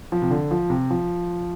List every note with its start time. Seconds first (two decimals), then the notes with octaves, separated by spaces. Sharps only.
0.12 F3
0.22 C3
0.31 D3
0.51 F3
0.70 C3
0.91 F3